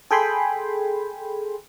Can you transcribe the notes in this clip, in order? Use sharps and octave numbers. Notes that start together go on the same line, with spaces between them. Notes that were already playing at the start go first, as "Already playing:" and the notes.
G#4 A4 G5 G#5 B5 C6